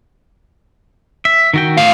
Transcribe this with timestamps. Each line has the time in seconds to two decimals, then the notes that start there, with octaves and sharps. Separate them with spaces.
1.25 E5
1.54 D#3 F#4 G5
1.77 A2 F5